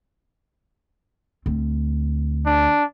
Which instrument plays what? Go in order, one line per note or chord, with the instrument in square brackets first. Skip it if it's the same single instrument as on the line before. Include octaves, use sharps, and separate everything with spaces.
[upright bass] D2 C4
[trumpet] D4